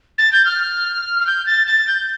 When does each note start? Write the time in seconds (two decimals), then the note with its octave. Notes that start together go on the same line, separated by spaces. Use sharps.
0.18 A6
0.32 G6
0.45 F6
1.20 F6
1.27 G6
1.46 A6
1.67 A6
1.87 G6